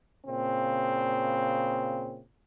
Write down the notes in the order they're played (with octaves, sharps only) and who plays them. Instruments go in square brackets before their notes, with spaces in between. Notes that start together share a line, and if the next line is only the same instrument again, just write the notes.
[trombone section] A#2 C#3 C4